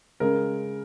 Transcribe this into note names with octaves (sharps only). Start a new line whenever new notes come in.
C#3 G#3 A#4